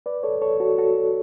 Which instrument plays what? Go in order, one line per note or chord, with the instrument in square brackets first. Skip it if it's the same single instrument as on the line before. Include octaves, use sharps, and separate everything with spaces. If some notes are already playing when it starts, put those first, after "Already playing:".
[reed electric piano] B4 D5
A4 C#5
A4 C#5
F#4 A4
F#4 A4